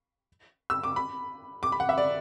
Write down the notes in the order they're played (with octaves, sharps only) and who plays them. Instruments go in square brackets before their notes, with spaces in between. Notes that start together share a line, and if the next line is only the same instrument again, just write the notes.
[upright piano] E6
D6
B5
D6
B5
F#5
E5
D5